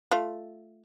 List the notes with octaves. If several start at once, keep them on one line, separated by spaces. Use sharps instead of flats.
A3 F4 F5